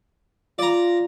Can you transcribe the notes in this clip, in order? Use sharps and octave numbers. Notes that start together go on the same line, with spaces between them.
F4 D5 A#5